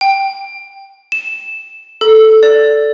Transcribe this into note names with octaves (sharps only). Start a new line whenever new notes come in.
G5
E7
A4
D5